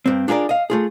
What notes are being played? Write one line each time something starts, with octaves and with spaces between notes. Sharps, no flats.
G2 C4
D4 F4 G#4 A#4 D5
D#5 F5
A3 F4 G#4